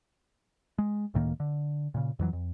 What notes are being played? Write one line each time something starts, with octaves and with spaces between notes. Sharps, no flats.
G#3
C#2 A2 D#3 A#3
D3
A#2 C#3
F2 E3 F#3
F2